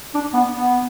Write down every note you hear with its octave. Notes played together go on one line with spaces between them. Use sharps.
D4
B3
B3